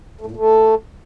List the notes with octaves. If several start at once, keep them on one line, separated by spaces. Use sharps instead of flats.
A3
A2
A#2
A3